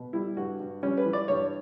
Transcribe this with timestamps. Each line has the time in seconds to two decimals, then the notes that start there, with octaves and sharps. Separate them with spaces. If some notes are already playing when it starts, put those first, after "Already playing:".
Already playing: B2
0.13 G3 E4
0.37 G2 F#4
0.60 G2
0.83 G3 C#4
0.98 B4
1.06 E3
1.13 D5
1.28 G2 C#5